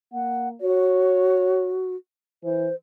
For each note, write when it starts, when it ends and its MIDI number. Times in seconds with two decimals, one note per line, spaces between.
0.13 0.56 58
0.13 0.49 78
0.61 1.95 66
0.61 1.72 73
2.44 2.69 52
2.44 2.74 72